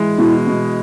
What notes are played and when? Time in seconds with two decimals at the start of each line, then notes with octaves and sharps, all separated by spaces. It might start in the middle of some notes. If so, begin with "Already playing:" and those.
Already playing: E3 G#3
0.18 B2 E4
0.47 B2